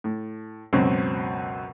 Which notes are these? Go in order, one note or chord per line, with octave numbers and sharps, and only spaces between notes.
A2
C#2 F#2 B2 C4 C#4